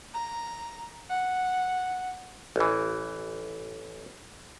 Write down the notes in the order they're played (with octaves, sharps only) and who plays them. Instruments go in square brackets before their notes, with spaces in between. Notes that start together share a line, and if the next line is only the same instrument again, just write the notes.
[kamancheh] A#5
F#5
[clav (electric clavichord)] A1 E3